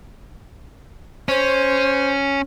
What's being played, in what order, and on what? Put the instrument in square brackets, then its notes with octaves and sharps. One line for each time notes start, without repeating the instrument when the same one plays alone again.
[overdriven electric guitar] C#4 [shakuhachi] C5